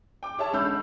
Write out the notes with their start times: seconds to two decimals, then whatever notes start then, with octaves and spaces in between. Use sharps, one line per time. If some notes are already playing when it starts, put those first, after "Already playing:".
0.23 G5 D6
0.38 G#4 C#5 E5 A5
0.53 D3 G#3 C#4 B5 E6 G6